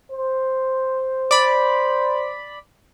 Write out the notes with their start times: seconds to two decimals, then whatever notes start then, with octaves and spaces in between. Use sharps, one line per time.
0.12 C5
1.31 D5 B5